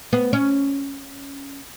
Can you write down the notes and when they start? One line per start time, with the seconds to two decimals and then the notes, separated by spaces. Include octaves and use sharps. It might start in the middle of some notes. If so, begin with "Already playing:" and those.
0.13 B3
0.33 C#4